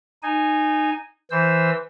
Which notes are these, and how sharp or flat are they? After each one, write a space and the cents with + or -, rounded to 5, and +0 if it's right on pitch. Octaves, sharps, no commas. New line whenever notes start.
D#4 -20 G#5 -5
E3 +0 C5 +0 E6 +0